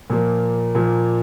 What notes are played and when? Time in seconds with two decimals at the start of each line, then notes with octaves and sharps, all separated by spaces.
0.10 A#2 F3 A#3
0.75 A#2 F3 A#3